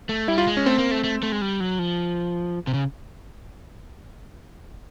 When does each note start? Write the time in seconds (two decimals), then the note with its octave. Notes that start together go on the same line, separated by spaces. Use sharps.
0.09 A3
0.28 G3 E4
0.38 F4
0.47 G#3
0.57 C#4
0.66 A3 C4
0.78 A#3
0.91 A3
1.04 A3
1.23 A3
1.32 G#3
1.42 G3
1.60 F#3
1.79 F3
2.67 C3
2.74 C#3